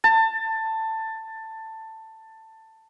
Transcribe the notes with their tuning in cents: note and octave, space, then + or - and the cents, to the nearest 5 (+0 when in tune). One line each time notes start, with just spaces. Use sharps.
A5 +15